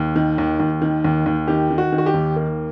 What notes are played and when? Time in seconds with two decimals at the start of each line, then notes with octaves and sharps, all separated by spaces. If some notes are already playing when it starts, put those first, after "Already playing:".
Already playing: D#2
0.16 D#3
0.38 D#2
0.60 D#2
0.82 D#3
1.05 D#2
1.26 D#2
1.48 D#3 G4
1.70 D#3
1.78 F#4
1.92 D#3
1.98 F#4
2.06 G4
2.14 D#2
2.36 A#3